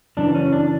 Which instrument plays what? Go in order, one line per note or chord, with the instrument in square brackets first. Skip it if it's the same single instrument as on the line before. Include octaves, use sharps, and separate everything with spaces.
[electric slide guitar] F#2 C#3 E3 D4
C#4
D4